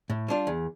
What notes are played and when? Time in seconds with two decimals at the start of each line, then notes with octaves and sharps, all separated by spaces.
0.10 A2
0.28 G3 D4 F4
0.47 E2